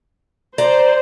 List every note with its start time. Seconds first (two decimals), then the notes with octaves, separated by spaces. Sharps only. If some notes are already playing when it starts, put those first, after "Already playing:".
0.58 C5 D5 A#5